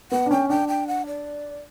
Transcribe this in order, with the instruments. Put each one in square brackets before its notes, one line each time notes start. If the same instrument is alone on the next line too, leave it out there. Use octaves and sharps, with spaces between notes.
[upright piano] B3 [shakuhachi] F#5
[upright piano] D4
[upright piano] C#4 [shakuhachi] G5
[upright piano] D4 [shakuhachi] G5
[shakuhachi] G5
F#5
D5